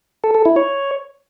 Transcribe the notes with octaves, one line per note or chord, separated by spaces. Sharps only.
A4
A4
E4
C#5